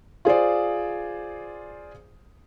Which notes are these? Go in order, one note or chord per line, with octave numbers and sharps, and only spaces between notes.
F4 G#4 C5 D5